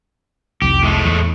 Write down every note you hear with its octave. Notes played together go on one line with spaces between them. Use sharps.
F1 C2 G4
A2 G#3 A3
E2